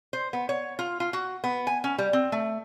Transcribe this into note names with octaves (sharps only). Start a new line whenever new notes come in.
C5
B3
C#5
F4
F4
F#4
B3
G#5
C#4
G3
C4
A3